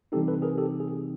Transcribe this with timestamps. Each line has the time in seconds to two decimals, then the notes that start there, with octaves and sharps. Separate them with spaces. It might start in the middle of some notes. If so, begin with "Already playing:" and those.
0.12 C3 E3 G3 C4 D#4 G4 A4
0.28 A4 B4
0.42 G#4 A#4
0.58 G4 A4
0.80 G#4